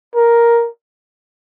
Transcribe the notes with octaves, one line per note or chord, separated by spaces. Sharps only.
A#4